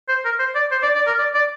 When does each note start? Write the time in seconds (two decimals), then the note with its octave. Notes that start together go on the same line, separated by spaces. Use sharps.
0.08 C5
0.25 A#4
0.39 C5
0.55 D5
0.72 C5
0.83 D5
0.95 D5
1.07 A#4
1.18 D5
1.34 D5